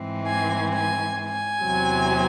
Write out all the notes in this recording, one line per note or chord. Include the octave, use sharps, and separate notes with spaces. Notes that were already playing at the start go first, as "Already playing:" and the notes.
Already playing: G#2 E3 G#3 C4
G#5
G#5
G#5
E2 C3 F#3 C4